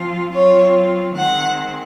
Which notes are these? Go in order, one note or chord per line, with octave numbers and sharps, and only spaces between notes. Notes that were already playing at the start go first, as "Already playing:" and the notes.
Already playing: F3 C4 F4
F#3 C4 F4 C#5
D#3 G#3 C4 F#5